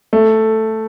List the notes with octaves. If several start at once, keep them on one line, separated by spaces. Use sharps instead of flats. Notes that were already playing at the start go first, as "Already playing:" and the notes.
A3